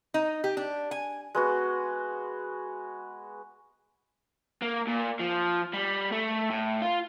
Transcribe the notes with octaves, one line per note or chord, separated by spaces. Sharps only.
D#4
G4
D4
G#5
G#3 B3 F#4
A#3
A#2
F3
G3
A3
A2
F4